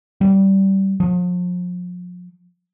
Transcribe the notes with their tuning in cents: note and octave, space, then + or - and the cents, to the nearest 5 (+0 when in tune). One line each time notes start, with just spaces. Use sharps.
G3 -20
F3 +40